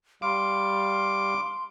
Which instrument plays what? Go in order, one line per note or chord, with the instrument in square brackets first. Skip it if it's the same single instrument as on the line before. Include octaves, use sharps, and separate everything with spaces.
[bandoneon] G3 F5 [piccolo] C6 [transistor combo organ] D6